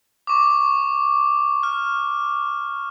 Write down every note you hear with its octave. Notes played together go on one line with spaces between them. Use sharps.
C#6 D6
F6